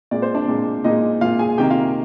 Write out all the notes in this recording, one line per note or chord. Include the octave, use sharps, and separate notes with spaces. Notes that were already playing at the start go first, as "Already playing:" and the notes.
A#2 G#3 D5
C5
D4 D5
A#2 G#3
A#2 G#3 D#4 D#5
A#2 G#3 F4 F5
G#4 G#5
C3 D#3 A#3 G4 G5
F4 F5